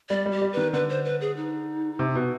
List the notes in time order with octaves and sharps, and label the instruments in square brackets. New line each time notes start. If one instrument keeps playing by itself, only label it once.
[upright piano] G3 [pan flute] D5
[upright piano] G3
[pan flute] G4
[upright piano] G3
[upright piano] D#3 [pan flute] B4
[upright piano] D3 [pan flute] B4
[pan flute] C5
B4
G#4
D#4
[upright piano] C3
B2